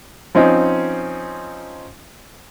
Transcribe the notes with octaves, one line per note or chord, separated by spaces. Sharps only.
F3 C4 C#4 D#4